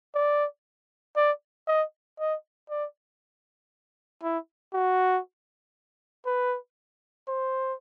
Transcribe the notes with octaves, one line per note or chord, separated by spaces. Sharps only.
D5
D5
D#5
D#5
D5
E4
F#4
B4
C5